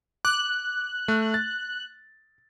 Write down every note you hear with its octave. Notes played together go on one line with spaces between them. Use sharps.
D6 F#6
A3
A6